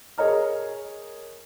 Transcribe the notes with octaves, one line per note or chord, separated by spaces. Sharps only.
G#4 A#4 C#5 D#5 A#5 F6